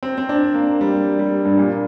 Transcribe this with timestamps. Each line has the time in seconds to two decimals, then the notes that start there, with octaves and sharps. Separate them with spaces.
0.03 C4
0.18 C4
0.29 D4
0.54 A#3
0.81 G3
1.19 G3
1.45 G2
1.58 A#2